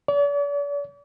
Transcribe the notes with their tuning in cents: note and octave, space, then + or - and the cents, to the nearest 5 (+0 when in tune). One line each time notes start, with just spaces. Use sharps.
D5 -45